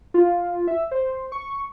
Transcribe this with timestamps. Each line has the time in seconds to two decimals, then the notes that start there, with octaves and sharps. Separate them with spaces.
0.14 F4
0.68 E5
0.91 C5
1.32 C#6